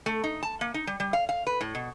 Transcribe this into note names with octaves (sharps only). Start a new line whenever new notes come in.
A3
D#4
A5
A#3
D#4
G3
G3
F5
F5
B4
A2
B2